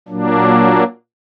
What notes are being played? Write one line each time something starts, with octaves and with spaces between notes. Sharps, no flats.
A#2 F#3 A#3 D4